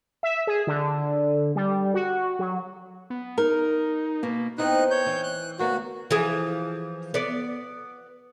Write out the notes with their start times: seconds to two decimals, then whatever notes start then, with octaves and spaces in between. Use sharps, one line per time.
0.23 E5
0.47 G#4
0.67 D3
1.56 G3
1.94 F#4
2.39 F#3
3.10 B3
3.38 D#4 A#4
4.23 B2 A#3
4.58 B3 C4 D#4 E4 F#6
4.91 C#5 G6
5.06 E3
5.23 F#6
5.59 D2 A#3 B3 F#4
6.11 E3 F3 G#4
7.14 B3 D5